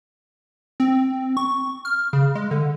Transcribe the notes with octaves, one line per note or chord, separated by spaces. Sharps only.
C4
C#6
F6
C#3
G#3
D3